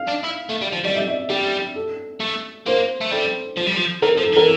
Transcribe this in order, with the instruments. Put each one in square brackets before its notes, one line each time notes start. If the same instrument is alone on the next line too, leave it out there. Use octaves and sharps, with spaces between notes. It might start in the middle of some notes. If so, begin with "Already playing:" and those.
Already playing: [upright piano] F5
[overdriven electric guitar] D4
E4
A3
G3
F3
[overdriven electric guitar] G3 [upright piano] D5
[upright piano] E5
D5
[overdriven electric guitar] G3 [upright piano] G4
[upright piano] A4
[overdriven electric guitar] A3
[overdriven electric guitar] A#3 [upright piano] C5
[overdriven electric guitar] A3
[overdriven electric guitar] G3 [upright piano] A4
[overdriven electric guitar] F3
G3
F3
[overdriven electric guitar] E3 [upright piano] A#4
[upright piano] A4
[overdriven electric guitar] F3
[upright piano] A4
[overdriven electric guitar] E3 [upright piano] A#4